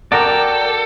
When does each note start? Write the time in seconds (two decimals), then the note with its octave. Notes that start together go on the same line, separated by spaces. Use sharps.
0.12 F#4 A4 A#4 D5 G5 D6